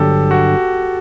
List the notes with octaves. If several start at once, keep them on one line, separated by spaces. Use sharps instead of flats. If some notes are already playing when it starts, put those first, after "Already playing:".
Already playing: G1 G2 D3 F#3 G4 A4
F#4